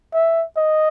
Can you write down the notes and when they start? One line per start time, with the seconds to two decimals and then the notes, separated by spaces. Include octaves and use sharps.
0.13 E5
0.57 D#5